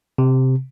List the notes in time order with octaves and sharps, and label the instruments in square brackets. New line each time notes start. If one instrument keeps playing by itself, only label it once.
[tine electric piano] C3